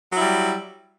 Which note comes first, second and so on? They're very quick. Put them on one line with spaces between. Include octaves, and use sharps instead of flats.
F#3 E4 G3